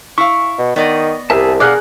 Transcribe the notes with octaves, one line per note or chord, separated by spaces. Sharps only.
E4 F5 C#6
B2
D#3 B3 D5 D#5
C2 G4 G#4 A#4 E5 A5
B2 G#4 A#4 D5 F5 F#5 F#6